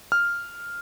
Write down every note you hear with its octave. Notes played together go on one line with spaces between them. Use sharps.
F6